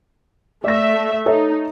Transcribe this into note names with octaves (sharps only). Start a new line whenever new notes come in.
A3 D5 E5 A#6
D#4 A4 C#5 E5